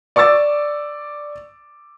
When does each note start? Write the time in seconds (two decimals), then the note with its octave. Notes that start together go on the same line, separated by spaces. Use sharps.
0.16 D5 C#6 D6 E6 A6